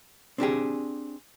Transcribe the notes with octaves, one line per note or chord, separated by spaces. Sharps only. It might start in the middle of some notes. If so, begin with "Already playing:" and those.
C4 D4 G4 G#4